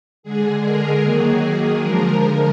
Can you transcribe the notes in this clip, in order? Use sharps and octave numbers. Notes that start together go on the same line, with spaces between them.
D3 G#3 G#4
A#4
D#3 F#3 A#3 G#4
D3 F3 G#3 A#4